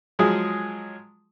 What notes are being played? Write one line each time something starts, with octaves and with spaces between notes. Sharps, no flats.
F3 F#3 G#3 G#4